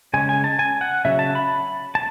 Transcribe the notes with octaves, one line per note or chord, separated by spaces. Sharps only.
C#3 G#3 C#4 G#5
G#5
A5
G#5
F#5
C#3 F#3 C#4 E5
A5
B5
A5